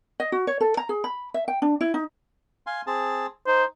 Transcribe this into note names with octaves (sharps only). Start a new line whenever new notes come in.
D#5
F#4
C#5
A4
A#5
G#4
B5
E5
G5
D4
E4
D#4
F5 G#5 C6
C4 G#4 A5
D#4 C5